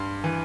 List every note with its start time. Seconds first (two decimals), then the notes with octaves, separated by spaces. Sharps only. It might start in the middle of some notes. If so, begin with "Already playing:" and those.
Already playing: G2 C6
0.24 E3